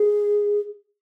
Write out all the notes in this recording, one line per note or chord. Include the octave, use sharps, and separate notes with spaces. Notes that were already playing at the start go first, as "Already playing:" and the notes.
Already playing: G#4